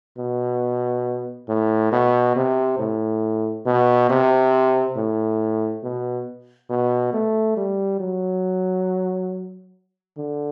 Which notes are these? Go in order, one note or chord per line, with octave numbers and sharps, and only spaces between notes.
B2
A2
B2
C3
A2
B2
C3
A2
B2
B2
A3
G3
F#3
D3